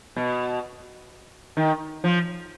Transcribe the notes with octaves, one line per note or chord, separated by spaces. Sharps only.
B2
D#3
F3